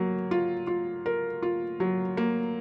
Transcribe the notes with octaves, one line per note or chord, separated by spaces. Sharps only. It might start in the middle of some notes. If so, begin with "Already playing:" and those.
Already playing: F#3 A#3
F4
F4
A#4
F4
F#3
A#3